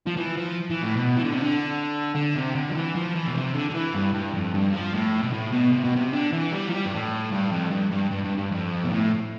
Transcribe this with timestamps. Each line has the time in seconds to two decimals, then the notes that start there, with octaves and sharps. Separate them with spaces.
0.07 F3
0.17 E3
0.37 F3
0.70 E3
0.83 A2
0.96 B2
1.17 E3
1.24 D3
1.33 C3
1.41 D3
2.15 D3
2.35 C3
2.55 D3
2.69 F3
2.75 E3
2.96 F3
3.15 E3
3.27 B2
3.35 C3
3.54 D3
3.70 D3
3.74 E3
3.94 G2
4.14 G2
4.34 F2
4.54 G2
4.73 F3
4.94 A2
5.23 B2
5.33 A2
5.53 B2
5.73 C3
5.85 B2
5.96 C3
6.13 D3
6.32 E3
6.52 G3
6.68 F3
6.72 G3
6.85 G2
6.91 A2
7.31 G2
7.52 F2
7.71 G2
7.91 G2
8.11 G2
8.24 G2
8.38 G2
8.51 F2
8.84 B2
8.90 A2